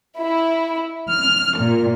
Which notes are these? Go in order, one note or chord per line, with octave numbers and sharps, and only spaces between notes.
E4
F6
A#2